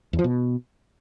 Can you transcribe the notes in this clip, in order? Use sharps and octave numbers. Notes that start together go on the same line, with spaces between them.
E2
F3
B2